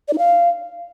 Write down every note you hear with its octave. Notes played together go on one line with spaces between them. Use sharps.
D5
D#4
F5